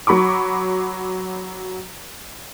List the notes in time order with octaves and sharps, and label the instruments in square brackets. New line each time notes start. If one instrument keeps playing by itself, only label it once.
[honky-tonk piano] F#3 B5 C#6 D6